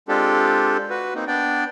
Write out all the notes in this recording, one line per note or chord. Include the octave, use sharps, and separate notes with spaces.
G#3 C4 D4 F4 G4 A4
F#4 B4
A#3 C4 D#4
B3 D4 D5 G5